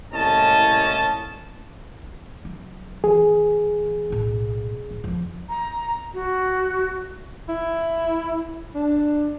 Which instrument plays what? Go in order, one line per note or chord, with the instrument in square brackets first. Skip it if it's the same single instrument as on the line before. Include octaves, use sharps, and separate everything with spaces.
[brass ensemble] C2 A2 A#3 C#4 D#5 A5
[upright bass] F#3
[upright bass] E3 [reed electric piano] G#4
[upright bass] B1 A2
A1
F2 C3
[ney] A#5
F#4
[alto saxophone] E4
D4